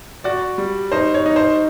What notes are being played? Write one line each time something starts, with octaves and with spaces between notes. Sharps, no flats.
F#4 D5
G3
D#4 C5
C#5
D#4
C5